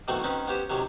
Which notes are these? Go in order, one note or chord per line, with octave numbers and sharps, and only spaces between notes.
B2 D#3 E3 F#3 A3 C4
D#3 C4 C#4 D#4 B4
B3 C#4 G4 C5
F#2 C3 D#3 F#3